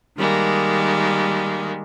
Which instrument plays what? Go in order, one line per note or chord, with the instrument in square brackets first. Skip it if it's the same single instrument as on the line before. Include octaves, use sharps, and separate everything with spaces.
[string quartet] D#3 G3 G#3 A#3